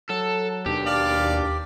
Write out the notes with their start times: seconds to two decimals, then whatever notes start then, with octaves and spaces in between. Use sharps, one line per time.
0.10 F#3 A4
0.66 D#2 B2 D4 G4
0.86 D5 F5